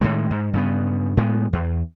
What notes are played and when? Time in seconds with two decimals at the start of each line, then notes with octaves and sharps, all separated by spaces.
0.01 A2 D#3 G#3
0.31 G#2
0.53 G2 C#3 B3
1.17 A2 G#3 B3
1.53 E2